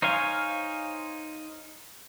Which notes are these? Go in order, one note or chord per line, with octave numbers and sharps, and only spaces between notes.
D#4 C5 C#5 F5 G#5